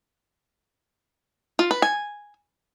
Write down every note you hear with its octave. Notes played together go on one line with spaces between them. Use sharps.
F4
B4
G#5